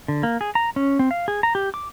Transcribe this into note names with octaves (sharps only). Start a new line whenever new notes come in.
D3
A#3
G#4
A#5
C#4
C4
F5
G#4
A#5
G4
D6